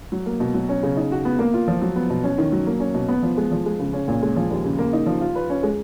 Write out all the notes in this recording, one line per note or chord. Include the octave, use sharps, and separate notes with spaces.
F#3
A#3
B2
F#3
C#4
C#3
D#4
F#4
B3
A#3
F4
F3
F#3
B3
B2
C#4
D#3
F#3
A#3
C#4
B2
B3
F3
G#3
F3
G#3
C#3
C#4
A#2
G#3
F3
D#2
C#3
A#3
D#4
F3
F4
B4
C#4
G#3